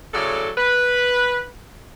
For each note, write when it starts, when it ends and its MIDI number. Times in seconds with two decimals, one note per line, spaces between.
0.14 0.51 45
0.14 0.51 49
0.14 0.51 54
0.14 0.51 69
0.14 0.51 74
0.58 1.45 71